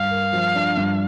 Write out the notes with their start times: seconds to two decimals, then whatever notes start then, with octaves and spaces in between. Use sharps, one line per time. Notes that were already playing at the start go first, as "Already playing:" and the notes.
Already playing: G2 F5
0.11 A#4
0.33 F3
0.55 D4
0.77 G2